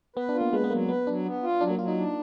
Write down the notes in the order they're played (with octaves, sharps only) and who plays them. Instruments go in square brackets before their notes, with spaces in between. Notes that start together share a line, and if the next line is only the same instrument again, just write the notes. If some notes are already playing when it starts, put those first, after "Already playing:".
[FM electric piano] B3 [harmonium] B4
[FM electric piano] D4
[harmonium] F4
[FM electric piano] A#3
[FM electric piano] G#3 [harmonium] B4
[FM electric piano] B3
[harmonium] F#3 [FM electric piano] A#3
[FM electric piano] B3 [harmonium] B4
[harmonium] F#3 [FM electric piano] D4
[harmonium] B3
F4
[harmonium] F#3 [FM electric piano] D4
[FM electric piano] A#3
[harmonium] F#3 [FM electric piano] F4
[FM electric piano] D#4
[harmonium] D4